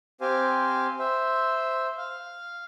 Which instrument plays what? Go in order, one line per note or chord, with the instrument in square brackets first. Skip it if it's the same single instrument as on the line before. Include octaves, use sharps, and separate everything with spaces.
[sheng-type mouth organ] C4 G4 C5 F5 G#5
C5 E5
F5